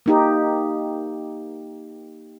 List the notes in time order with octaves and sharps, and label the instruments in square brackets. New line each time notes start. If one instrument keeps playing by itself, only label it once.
[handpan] A#3 D#4 G4